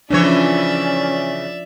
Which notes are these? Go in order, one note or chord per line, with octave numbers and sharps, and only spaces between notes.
C#3 E3 F3 C#4 D4 C#5 D5 E5